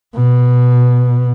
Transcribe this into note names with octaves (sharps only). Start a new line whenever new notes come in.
B2